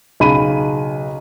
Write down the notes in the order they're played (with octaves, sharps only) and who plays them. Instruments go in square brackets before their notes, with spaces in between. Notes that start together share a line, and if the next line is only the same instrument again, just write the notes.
[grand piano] B1 C#3 B5 D#7